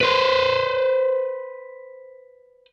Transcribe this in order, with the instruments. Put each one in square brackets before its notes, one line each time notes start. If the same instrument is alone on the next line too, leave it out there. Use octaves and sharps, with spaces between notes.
[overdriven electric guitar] B4 C5